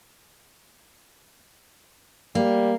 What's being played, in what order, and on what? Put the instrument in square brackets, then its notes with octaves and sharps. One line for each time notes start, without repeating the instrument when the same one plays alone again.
[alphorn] G3 [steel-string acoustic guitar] A#3